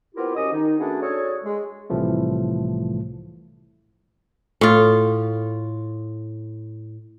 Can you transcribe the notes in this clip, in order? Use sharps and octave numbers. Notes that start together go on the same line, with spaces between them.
B3 C4 E4 F4 G4 A#4
C2 F#2 C#4 G4 D#5 D#6
D#3 D#4
A3 B3 C#4 D4 F#4 G#4
C#4 D4 F#4 G#4 A4 C#5
G#3
C2 A2 C3 E3 F3 A3
A2 F4